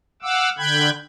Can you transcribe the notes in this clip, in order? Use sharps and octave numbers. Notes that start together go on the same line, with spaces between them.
F5 F#5 D6 E6
D3 G5 B5 F#6 G#6